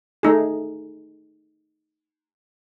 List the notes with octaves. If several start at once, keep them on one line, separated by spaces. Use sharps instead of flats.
A3 D#4 G#4